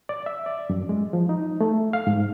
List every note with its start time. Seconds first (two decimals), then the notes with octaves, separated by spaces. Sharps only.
0.09 D5
0.26 E5
0.46 D5
0.70 F#2
0.89 G#3
1.13 F3
1.29 D#4
1.61 A3
1.93 F5
2.07 G#2